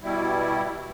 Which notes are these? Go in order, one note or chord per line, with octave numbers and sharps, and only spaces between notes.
B2 G3 E4